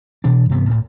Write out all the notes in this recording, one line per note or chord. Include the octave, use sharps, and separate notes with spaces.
B2 E3 D4
G2 C3 E3 B3
D2 A2